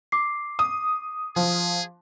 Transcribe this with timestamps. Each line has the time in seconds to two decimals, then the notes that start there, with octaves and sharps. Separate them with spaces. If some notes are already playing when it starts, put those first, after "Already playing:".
0.12 D6 C7
0.59 D#6
1.36 F3 G#4